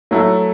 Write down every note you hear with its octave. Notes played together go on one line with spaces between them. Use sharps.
F#3 A3 E4 A4